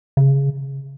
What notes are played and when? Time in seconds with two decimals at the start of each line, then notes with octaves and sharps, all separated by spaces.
0.17 C#3